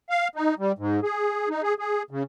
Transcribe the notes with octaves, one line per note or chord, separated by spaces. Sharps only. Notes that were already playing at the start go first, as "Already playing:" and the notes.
F5
D#4
G3
G#2
G#4
D#4
G#4
G#4
C#3